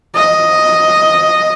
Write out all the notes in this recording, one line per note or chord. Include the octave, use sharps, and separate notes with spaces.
D#5